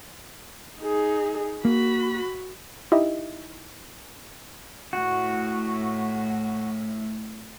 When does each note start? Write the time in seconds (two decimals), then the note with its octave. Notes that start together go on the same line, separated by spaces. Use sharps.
0.79 D#4 G#4
1.65 A#3 F#4 B5
2.92 D#4 E4 G4 D#5 E5
4.93 A2 F#4